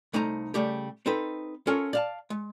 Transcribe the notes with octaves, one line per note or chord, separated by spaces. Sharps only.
C2 A3 D#4 C5 A#5
C#3 G3 A3 G4
C4 D#4 A4 B4
C#4 F4 A4 A#4 C#5
D5 F5 A5
G#3